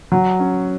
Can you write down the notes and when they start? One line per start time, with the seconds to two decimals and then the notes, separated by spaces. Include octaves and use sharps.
0.12 F#3
0.40 C#4